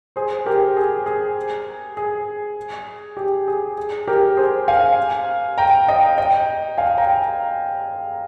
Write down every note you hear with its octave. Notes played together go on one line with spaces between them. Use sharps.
G#4 C5
G4 A#4
G#4
G#4
G#4
G4
G#4
G#4
G4 A#4
G#4 C5
F5 G#5
G5 A#5
D#5 G5
D#5 G5
F5 G#5
G5 A#5